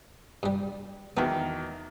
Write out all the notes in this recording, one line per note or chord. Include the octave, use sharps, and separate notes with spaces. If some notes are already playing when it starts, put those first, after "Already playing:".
G2 G3
E2 D#3 B3 F#4